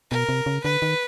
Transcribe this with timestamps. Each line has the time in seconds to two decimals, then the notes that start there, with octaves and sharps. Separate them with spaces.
0.11 B2 A#4
0.29 C3
0.46 C#3
0.64 D3 B4
0.82 D#3